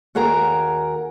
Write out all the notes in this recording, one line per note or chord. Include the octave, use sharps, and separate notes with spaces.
D#2 F#4 G#4 A#4 A#5